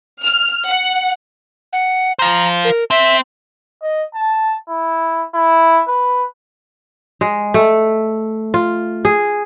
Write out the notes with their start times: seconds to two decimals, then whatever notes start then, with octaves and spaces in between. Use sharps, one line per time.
0.22 F6
0.66 F#5
1.73 F#5
2.19 F4 C5 A#5
2.65 A#4
2.91 C4 E5
3.82 D#5
4.14 A5
4.69 E4
5.34 E4
5.88 B4
7.21 G#3
7.54 A3
8.54 F4
9.05 G#4